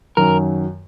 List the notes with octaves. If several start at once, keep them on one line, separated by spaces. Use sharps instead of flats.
F#2 D#3 F#3 A#4